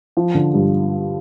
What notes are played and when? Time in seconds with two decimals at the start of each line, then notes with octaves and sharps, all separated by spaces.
0.17 F3
0.35 D3
0.54 G2